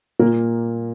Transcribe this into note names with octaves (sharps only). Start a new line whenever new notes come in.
A#2 A#3